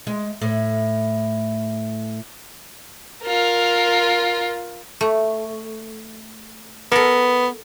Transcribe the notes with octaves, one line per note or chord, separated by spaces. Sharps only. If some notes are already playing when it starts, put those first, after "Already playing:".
G#3
A2
F4 A#4
A3
B3 A4 A#4